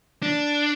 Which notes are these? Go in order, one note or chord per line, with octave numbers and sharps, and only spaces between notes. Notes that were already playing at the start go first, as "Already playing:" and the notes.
D4